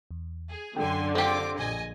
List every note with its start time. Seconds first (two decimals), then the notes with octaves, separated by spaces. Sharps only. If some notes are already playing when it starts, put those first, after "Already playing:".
0.11 E2
0.47 G#4
0.76 F#2 D3 G5 G#5 C6
1.15 C4 F4 G4 G5 D6
1.56 A#1 D#5 G#5